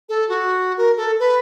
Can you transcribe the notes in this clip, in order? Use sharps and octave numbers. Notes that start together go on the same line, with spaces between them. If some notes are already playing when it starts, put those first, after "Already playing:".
A4
F#4
A#4
A4
B4